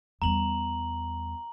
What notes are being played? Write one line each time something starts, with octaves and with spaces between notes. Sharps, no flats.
E2 G3 A#5 F#7